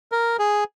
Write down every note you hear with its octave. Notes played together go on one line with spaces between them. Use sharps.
A#4
G#4